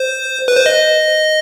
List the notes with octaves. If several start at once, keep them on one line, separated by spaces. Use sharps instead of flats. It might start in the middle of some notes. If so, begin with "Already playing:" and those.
Already playing: C5
B4
C5
D#5